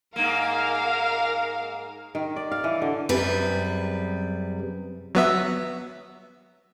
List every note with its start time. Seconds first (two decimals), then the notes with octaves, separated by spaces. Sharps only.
0.16 G#2 A#3 A#4 F5
2.15 D#3
2.36 D5
2.51 F5
2.64 E3
2.82 D3
3.09 F#2 C3 G3 G#4 B4
5.15 F#3 B3 E5